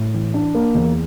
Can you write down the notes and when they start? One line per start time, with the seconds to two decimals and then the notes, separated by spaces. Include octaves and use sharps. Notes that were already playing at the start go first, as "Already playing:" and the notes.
Already playing: A2
0.14 E3
0.34 D4
0.55 A#3
0.75 E2